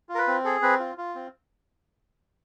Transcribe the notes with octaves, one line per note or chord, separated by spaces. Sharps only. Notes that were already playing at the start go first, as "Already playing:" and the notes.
F4
A#4
B4
C4
G#4 A4
C4 B4
F4
F4
C4